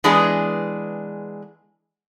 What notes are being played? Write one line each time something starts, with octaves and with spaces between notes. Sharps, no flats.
E3 G#3 B3 D4 G#4